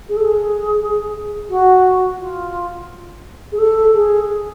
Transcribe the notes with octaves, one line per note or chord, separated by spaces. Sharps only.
G#4
A4
G#4
F#4
F4
G#4
A4
G#4
G#4